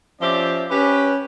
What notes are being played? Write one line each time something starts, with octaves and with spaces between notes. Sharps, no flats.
F3 C#4 G4 C5 D5 E5
C#4 G4 B4